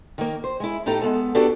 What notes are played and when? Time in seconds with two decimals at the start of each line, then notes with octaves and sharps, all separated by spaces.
0.18 D#3 A#3
0.44 C5
0.60 G#3 E4
0.86 A2 D#4 G4 A4 A#5
1.02 G#3 B3 A4
1.35 B3 D4 F#4 G4 A4